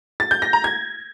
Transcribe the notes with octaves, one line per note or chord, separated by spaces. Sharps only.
A6
G6
A#6
A#5
G#6